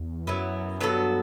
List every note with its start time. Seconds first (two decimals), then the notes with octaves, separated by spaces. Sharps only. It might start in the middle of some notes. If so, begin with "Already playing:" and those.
Already playing: E2
0.27 F#2 F#3 B3 E4
0.79 G2 F#3 B3 F#4 A4